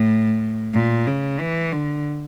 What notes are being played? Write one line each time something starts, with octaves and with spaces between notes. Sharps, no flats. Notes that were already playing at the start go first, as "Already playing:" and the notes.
Already playing: A2
A#2
C#3
E3
D3